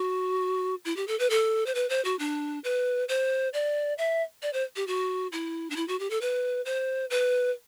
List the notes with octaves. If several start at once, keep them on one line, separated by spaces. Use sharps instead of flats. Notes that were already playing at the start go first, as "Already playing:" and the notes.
Already playing: F#4
E4
G4
A4
B4
A4
C5
B4
C5
F#4
D4
B4
C5
D5
E5
D5
C5
G4
F#4
E4
D4
E4
F#4
G4
A4
B4
C5
B4